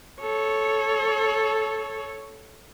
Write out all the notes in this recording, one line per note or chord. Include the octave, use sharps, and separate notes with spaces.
A4 C#5